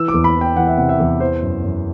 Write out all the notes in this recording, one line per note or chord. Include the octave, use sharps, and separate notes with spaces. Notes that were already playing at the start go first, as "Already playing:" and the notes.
Already playing: E3 E6
D6
E2
B5
E3
G5
E3 F#5
E5
C3 F#5
E5
E2
E3 C5
F#2
F#2